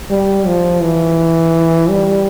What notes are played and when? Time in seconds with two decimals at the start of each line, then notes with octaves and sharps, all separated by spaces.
0.10 G3
0.46 F3
0.83 E3
1.90 G3